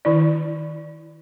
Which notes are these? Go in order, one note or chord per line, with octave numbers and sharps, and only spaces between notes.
D#3 E4 D5